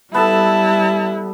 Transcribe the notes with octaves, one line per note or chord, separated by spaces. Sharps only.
G3 B3 E4 A4 A5